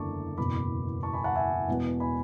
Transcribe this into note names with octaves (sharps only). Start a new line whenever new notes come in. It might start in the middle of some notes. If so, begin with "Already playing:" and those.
Already playing: F#1 E2 D3 A3 D4 A5 C#6 D6
F#1 E2 B2 B5 D6
A5 C#6
G#5 B5
F#5 A5
E5 G#5
E1 E2 B2
G#5 B5